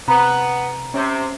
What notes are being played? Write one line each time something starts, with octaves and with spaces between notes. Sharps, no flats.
C3 B3 A#5 B5
C3 C#4